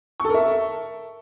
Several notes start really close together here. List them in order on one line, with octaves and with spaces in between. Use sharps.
C#6 A4 A#4 E5